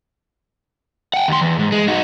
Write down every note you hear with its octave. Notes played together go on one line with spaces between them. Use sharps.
F#5 G5
D#2 C6
E2
G#2
G#3
D#4 F#4